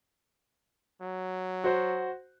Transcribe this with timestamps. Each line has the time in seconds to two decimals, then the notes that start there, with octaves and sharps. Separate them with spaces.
1.02 F#3
1.64 F#4 C5